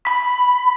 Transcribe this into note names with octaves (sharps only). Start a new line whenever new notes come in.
B5